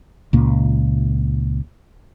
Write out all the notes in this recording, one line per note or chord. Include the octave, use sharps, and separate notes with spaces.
C#2 A#2 A#3